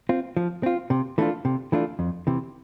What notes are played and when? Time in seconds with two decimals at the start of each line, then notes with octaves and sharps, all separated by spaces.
0.09 C4 F4
0.37 F3
0.63 C4 F4
0.90 C3
1.18 E3 A3 D4 F4
1.45 C3
1.72 E3 A3 D4 F4
1.99 F2
2.27 C3 E3